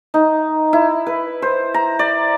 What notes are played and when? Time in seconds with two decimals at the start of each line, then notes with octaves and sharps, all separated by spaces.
0.14 D#4
0.73 E4
1.06 B4
1.42 C5
1.74 A#5
1.99 D5